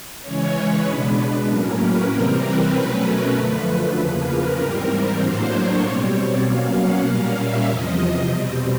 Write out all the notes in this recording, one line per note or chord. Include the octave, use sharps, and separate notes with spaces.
C#3 E3 G#3 C#4 C#5
B4
B2 G#3 B3 D4
A2 F#3 A#3 C#4 A#4
B4
C3 E3 G3 C4 A#4
B4
B2 F#3 A3 C#4
A#4
F#2 D3 F3 A3 B4
E2 C#3 F3 A#3 B4
A#4
G#2 E3 G3 C4
A2 F#3 A#3 D4 C5
C#5
B2 G3 C4
D5
B2 F#3 A#3 C#4 F5
F#5
A#2 G3 A#3 C#4 F5
E5
E2 C3 F3 D#5
B2 G3 C4